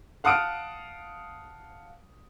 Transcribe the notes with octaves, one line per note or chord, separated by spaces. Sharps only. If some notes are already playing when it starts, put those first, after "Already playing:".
F5 F#5 A5 D#6 F6 D7